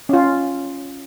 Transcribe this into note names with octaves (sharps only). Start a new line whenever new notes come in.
C#4 F4